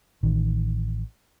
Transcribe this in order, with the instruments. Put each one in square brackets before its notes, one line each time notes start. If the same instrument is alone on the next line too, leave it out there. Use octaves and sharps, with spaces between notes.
[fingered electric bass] A1 D#3